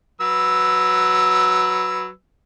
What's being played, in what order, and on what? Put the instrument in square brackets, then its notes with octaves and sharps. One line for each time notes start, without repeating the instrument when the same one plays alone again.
[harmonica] F#3 B4 E6